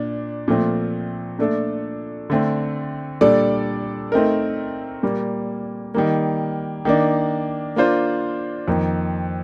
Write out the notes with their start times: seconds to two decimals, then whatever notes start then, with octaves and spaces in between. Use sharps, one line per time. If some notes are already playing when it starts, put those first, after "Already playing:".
Already playing: A#2 D4
0.48 A#2 F3 A3 C4
1.39 A#2 A3 D4 A4
2.30 D3 A3 C4
3.21 A#2 G3 D4 A4 D5
4.12 A3 C4 D#4 A#4
5.03 A#2 G3 A#3
5.94 D#3 G3 A#3
6.85 D#3 A#3 D4
7.76 A#3 D4 F4 C5
8.68 F2 D#3 A#3